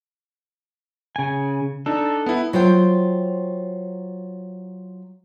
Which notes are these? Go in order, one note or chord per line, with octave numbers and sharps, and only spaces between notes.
C#3 G#5
D4 D#4 A4
B3 E4
F#3 F4 C5 G5